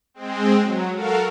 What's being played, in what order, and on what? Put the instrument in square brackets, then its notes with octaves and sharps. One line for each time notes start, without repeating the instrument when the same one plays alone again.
[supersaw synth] G#3 C4
F#3
F#4 A4 A#4 F5